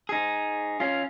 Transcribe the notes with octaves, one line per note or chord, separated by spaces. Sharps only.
D#4 G#4
C#4 F4